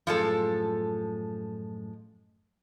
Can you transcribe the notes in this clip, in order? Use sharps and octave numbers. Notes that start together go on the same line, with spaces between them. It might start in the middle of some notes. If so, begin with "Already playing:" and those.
F#2 A2 F3 G#3 A4